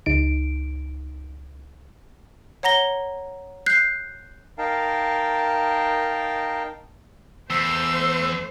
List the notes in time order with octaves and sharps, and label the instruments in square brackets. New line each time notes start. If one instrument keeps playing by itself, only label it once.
[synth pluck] C#2 D#4 D7
[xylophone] C#5 F#5 A#5 A#6 G7
F#6 G6 C7
[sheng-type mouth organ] D#4 A#4 F5 G5 A5
[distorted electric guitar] E2 [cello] A3 C5 [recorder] E6